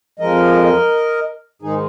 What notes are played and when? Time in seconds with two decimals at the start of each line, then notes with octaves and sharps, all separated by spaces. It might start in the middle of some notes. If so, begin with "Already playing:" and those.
0.19 F2 F3 G#3 A#4 D#5
1.62 G#2 D#3 G#3 D#4 G#4